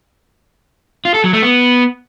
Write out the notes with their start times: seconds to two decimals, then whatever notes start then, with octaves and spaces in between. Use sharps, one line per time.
1.05 F4
1.14 A4
1.24 F#3
1.33 A3
1.43 B3